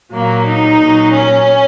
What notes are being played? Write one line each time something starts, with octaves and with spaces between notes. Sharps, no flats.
A#2 F#3 A#3
D#4
A#2 F#3
C#4